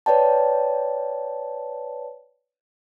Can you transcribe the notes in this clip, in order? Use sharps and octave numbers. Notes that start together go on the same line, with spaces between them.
B4 C#5 D5 G5 A5